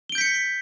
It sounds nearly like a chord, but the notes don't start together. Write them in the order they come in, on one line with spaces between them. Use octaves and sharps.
G7 D7 G6 B6 C#7